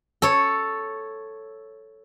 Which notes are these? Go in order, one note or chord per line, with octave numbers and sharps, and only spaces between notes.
A4 C#5